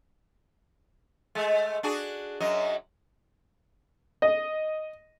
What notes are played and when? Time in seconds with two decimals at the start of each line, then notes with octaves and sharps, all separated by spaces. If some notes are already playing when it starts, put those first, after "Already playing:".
1.35 G#3 A3
1.83 D4 F#4 G#4
2.40 F#2 F#3 D#5
4.22 D#5